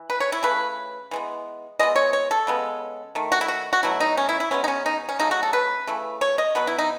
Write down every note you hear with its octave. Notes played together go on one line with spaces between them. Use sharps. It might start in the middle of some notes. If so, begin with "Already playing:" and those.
Already playing: E3
B4
C#5
E4
C#3 E3 A3 B4
E3 G#3 B3
E3 G#3 B3 D#5
C#5
C#5
A4
C#3 G#3 B3
D#3 A3
F#4
E4
F#4
F#4
B2 F#3 A3 E4
D#4
C#4
E4
E4
B2 G#3 B3 C#4
D#4
C#4
D#4
C#4
C#3 F#3 A3 D#4
F#4
A4
B4
C#3 E3 A3
C#5
D#5
B2 F#3 B3 B4
E4
D#4